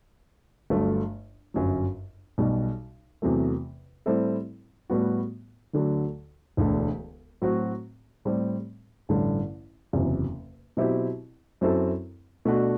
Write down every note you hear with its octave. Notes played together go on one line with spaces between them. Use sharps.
G1 G2 F#3 A3
G1 F#2 F#3
B1 B2 G3
E2 C3 F#3 A3
A2 G3 C4 E4 A4
A2 G3 B3 F#4
D2 D3 F#3
E1 D2 D3
A2 F#3 C4 F#4
A2 G3 C4
A1 G2 D3
F#1 E2 C3 F#3
B2 F#3 C4 E4 G4
F#2 F#3 C4 E4 A4
B2 A3 D4 F#4